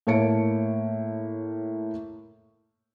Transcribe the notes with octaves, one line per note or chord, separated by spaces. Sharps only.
A2 A#3 C#5 A5 C#7 D7